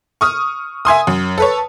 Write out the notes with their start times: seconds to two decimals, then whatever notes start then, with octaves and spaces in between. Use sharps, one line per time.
0.21 C#6 D#6 F6
0.85 E5 G#5 C6 D#6
1.07 F#2
1.38 A4 B4 C#5